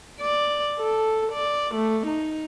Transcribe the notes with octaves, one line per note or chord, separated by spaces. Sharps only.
D5
A4
D5
A3
D#4